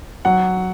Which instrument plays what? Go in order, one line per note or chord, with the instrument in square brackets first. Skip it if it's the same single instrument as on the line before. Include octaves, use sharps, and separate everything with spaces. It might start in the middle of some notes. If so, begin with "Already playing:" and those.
[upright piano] F#3 F#5